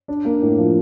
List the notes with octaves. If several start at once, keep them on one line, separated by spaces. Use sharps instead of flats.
D4
A#3
A2
F3